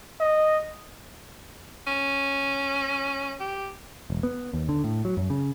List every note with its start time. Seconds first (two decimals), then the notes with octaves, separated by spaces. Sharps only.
0.20 D#5
1.87 C#4
3.40 G4
4.10 E1
4.23 B3
4.53 D#2
4.69 D3
4.84 A2
5.05 F#3
5.17 F#2
5.30 C#3